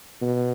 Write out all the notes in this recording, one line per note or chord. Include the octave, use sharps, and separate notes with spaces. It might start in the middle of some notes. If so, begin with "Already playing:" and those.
B2